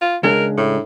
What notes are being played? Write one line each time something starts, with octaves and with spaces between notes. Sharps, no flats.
F4
C#2 G#3 D4 A#4
A2